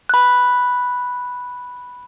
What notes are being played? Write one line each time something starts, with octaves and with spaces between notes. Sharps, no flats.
B5 F#6